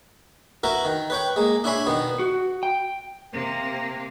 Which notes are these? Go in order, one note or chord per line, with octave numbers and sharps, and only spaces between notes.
E4 F#4 A#4 B4
D#3
B4 C#5 G5
G#3 A#3
D4 E4 C#5 G#5 B5 C6
B2 D#3 B3
F#4
G5
C3 A#3